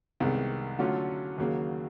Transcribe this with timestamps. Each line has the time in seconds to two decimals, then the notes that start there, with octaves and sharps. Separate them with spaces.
0.20 C2 C3 D#3 G#3 B3
0.79 D3 F#3 A3 C#4 F4
1.38 D#2 C#3 F#3 A#3